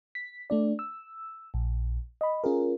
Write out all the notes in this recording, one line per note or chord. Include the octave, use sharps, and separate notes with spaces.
B6
A3 D4 D5
E6
A#1
D#5 B5
C#4 F4 G#4 A#4